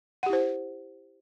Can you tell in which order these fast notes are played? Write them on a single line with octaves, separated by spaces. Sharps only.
F#5 G4 E4 C5